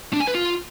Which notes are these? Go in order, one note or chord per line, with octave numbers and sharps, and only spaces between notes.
D4
G#5
B4
F4